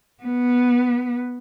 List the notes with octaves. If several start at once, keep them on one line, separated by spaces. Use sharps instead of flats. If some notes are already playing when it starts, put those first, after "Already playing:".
B3